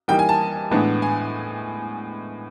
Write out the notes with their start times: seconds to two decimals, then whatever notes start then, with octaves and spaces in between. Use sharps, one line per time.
0.08 E3 G3 A#3 D#4 G5
0.19 G#5
0.29 A5
0.71 A2 E3 G#3 B3 D4
1.02 G#5